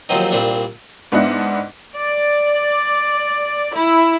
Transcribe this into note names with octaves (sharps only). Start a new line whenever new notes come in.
D#2 F3 F#3 C4 D#4
C2 A#2 C4 D4 C#6
G#2 B3 D4 E4 D#5 F#5
D5
E4